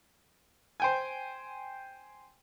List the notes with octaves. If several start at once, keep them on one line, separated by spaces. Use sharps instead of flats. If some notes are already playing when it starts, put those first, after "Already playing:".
C5 G5 G#5